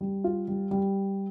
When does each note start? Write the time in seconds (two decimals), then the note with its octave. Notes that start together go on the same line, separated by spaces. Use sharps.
0.01 G3
0.24 F4
0.48 G3
0.71 G3